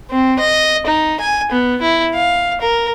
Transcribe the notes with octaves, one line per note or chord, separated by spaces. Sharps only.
C4
D#5
D#4
G#5
B3
E4
F5
A#4